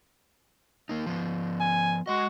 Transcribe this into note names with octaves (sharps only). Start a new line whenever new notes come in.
A#3 D#4
F3 B3
G#5
G#3 F#4 D#5